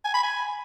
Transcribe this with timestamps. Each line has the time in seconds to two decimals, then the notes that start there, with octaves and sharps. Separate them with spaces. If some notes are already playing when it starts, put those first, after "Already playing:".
0.04 G#5
0.14 B5
0.23 G#5